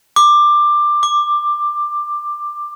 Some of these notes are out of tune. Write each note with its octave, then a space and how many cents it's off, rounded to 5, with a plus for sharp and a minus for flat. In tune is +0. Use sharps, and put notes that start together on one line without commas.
D6 +15
D6 +5